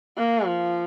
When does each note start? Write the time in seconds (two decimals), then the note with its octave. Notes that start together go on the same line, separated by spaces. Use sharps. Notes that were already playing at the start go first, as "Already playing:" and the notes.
0.17 A#3
0.46 F3